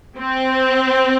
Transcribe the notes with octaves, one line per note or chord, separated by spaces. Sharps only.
C4